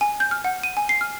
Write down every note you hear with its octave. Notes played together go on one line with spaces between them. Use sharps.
G#5
G6
F6
F#5
D#7
G#5
C7
F6